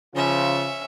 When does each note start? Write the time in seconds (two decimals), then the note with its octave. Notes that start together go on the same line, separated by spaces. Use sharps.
0.16 C#3 F3 C#4 F4 E5